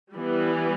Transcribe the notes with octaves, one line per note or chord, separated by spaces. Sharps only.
E3 G3 B3